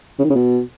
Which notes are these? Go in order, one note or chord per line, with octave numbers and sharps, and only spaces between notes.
C#3
D#3
C#3
B2